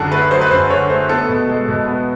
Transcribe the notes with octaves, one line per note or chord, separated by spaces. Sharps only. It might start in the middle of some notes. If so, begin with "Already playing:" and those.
Already playing: F#2 D3 F#3 G#4 A4
A3 B4
F#3 C5
B4
F#2 C5
D3 C#5
A3 C5
B3 A4
B2
G#3
B2
B3